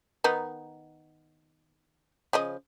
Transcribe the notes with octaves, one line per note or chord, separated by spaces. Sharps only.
D#3 B3 D#4
C#3 F3 D#5